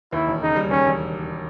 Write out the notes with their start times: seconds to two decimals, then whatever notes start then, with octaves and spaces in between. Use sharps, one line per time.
0.13 D#2 E4
0.27 E1
0.41 C#3 D#4
0.56 G3
0.71 D#2 C#4
0.85 E1